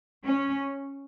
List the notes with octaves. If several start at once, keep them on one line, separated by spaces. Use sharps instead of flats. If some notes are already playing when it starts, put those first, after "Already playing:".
C#4